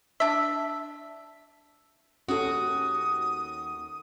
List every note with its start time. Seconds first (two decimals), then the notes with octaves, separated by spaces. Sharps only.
0.20 D4 E5
2.28 D#2 C#4 F#4 A4 D#6